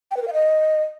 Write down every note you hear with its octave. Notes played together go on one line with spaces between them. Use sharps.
G5
B4
A#4
F5
D#5